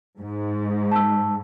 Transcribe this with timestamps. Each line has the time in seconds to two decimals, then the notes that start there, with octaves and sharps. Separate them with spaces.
0.20 G#2
0.92 A5 E6